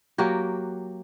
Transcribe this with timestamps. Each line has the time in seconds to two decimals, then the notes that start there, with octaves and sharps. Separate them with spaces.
0.18 F#3 A#3 F#4 G4